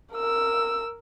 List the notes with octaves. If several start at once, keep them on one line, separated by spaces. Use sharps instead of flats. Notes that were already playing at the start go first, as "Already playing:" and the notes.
A#4 E6